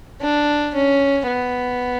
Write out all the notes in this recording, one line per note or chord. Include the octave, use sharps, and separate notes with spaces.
D4
C#4
B3